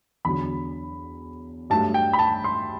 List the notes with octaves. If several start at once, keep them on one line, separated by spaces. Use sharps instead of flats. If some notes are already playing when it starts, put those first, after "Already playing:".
E2 D3 F#3 B5
G2 F#3 A3 A5
G5
B5
A5
C6